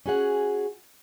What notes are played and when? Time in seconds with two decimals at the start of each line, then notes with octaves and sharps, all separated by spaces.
0.06 C#4 F#4 G#4 F#5